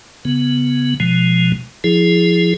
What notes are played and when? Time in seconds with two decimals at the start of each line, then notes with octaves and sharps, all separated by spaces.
0.25 C#3 B3
1.00 B2 F3 G#3
1.84 F3 E4 G#4